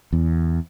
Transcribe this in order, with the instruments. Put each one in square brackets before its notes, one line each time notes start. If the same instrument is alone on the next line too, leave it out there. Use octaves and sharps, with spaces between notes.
[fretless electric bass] E2